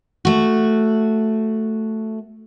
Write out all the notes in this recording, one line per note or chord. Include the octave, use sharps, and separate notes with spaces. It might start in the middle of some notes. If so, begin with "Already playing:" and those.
A3 F#4